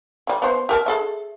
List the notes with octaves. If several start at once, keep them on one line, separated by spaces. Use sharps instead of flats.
D3 G3
B3 C5
G4 A#4 A5
G#4 A4 E5